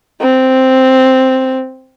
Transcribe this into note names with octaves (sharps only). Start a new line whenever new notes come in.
C4